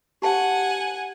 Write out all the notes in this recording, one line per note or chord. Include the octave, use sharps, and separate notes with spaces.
G4 F#5 G#5 A5